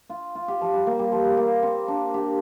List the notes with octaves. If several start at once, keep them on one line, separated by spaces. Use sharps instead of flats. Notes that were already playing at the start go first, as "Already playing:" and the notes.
F4
F4
G4
F3
G3
A#3
G3
F3
G3
A#3
C4
D4
G4